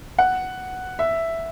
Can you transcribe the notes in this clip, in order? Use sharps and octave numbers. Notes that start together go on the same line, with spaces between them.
F#5
E5